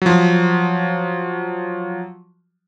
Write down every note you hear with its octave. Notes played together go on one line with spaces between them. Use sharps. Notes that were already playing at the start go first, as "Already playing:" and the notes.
F3 F#3